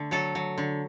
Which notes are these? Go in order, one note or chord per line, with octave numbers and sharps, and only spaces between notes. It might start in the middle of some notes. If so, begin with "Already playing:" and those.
Already playing: D3 A3
F#3 A4
F#3
D3